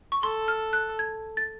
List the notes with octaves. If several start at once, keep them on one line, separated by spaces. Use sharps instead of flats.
C#6
A4 C6
F6
F#6
G#6
A6